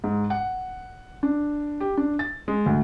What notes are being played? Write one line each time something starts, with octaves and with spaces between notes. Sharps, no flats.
G#2
F#5
D4
G4
D4
A6
G#3
D2